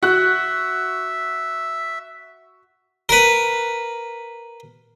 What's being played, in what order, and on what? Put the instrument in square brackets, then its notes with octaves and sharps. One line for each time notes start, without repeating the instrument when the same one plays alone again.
[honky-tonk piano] F#4 F#6 [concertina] E5
[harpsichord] A#4 B4